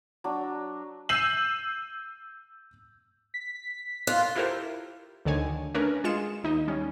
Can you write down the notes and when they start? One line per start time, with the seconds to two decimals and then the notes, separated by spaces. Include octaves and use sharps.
0.24 F#3 D4
1.09 E6 G6 C7 D#7 E7 F#7
3.34 B6
4.07 F4 F#6
4.35 E4 F4 G4 A4 A#4 C5
5.25 D2 D3 D#3 C#5 G#5
5.74 A3 C#4 D4 A#4 B4
6.04 G#3 F4 G#4 C#7 E7
6.44 D#2 D#4 D#5
6.68 G3 C#4